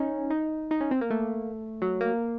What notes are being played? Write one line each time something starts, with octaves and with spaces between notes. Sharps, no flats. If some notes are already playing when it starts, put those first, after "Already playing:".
Already playing: C#4 D#4
D#4
D#4
C#4
C4
A#3
A3
F#3
A#3